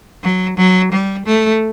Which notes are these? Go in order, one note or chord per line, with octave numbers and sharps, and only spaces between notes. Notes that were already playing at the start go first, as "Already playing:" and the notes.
F#3
F#3
G3
A3